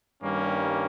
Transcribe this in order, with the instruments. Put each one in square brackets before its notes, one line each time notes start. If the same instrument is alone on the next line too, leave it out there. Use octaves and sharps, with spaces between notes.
[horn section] G2 D#3 G3 A#3 C#4